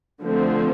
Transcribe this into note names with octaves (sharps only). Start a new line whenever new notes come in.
D3 F3 A3 C4